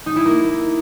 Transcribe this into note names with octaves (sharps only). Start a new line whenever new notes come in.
D#4
E4
A#3